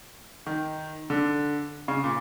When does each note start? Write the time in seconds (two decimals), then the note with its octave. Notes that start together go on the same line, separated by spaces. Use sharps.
0.46 D#3
1.10 D3
1.88 C#3
2.04 A#2